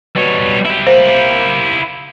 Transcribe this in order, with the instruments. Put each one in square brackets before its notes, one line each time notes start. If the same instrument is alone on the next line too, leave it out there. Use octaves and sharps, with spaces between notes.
[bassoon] B2 [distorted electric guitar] G3 C#5
[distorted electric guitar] E4 G4
[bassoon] A#3 [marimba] C5